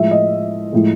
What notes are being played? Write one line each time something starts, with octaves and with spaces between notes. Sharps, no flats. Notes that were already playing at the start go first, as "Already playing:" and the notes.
Already playing: A2 F3 G#3 E5
D#5
A2 F3 G#3